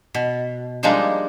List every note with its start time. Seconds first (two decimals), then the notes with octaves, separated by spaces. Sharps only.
0.14 B2
0.83 F3 G3 G#3 A#3 D4 D#4